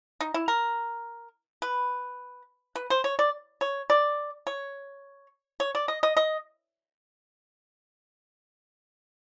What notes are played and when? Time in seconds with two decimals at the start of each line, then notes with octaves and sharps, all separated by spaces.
0.21 D#4
0.34 E4
0.48 A#4
1.62 B4
2.76 B4
2.90 C5
3.04 C#5
3.19 D5
3.61 C#5
3.90 D5
4.47 C#5
5.60 C#5
5.75 D5
5.88 D#5
6.03 D#5
6.17 D#5